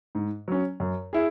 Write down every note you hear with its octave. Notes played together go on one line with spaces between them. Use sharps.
G#2
F#3 C#4
F#2
E4 G#4